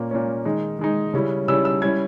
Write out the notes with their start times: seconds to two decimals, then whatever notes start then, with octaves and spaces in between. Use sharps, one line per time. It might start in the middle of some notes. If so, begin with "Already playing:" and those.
Already playing: A#2 A#3 C#4
0.11 A#2 A#3 C#4
0.45 D#3 G#3 D#4
0.79 D#3 G#3 D#4
1.14 C#3 G3 C#4 E4
1.48 C#3 G3 C#4 E4 E6
1.65 E6
1.82 G3 C#4 E4 G#6